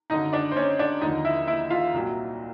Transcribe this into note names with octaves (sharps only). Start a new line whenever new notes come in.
G#1 F#2 D3 D#4 D#5
D4 D5
C5
C#4 C#5
D4 D5
D#2 D3 F3 D#4 D#5
E4 E5
E4 E5
F4 F5
C2 A#2 F#3